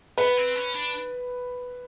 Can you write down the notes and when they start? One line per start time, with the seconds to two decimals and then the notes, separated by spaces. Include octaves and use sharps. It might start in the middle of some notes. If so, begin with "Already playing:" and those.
0.18 B3 B4
0.37 C4
0.55 C#4
0.74 D4